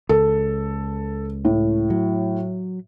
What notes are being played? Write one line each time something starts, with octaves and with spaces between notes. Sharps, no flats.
C#2 A4
A2
F#3